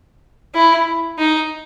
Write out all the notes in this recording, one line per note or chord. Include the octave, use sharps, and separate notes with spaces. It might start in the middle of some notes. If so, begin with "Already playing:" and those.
E4
D#4